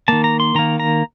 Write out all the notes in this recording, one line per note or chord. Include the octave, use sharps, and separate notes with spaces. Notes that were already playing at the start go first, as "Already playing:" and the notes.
D#3 A#3 A5
A#5
C6
D#3 A#3 A#5
A#5